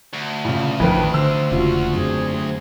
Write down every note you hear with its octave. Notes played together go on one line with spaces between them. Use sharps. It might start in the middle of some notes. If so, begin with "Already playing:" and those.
D2
A#2 C#3
A1 F2 D#3 B4 G5
D3 C5 E6
E1 C#3 F4 F#4
F#2 C4 G#4